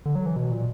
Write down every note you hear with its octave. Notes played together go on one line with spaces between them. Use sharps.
D3
F#3
E3
B2
A#2